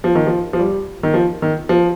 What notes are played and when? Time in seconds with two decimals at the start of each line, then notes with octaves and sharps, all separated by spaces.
0.04 F3
0.15 D#3
0.26 F3
0.53 F3
0.59 G3
1.03 D#3
1.14 F3
1.42 D#3
1.69 F3